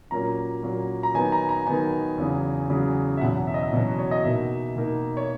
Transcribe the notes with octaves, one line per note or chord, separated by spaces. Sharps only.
A#2 F#3 A#3 C#4 A#5
A#2 F#3 A#3 C#4
A#5
D#3 F#3 B3 D#4 G#5
A#5
A#5
D#3 F#3 B3 D#4 G#5
E2 C#3 F#3
E2 C#3 F#3
E5
E2 B2 F#3 C#4 F#5
E5
D#5
E5
E2 B2 F#3 C#4
C#5
D#5
B2 A#3 D#4 E5
B2 A#3 D#4
C#5